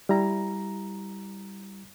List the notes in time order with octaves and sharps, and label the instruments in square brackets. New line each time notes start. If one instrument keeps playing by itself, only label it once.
[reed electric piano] G3 E4 A#5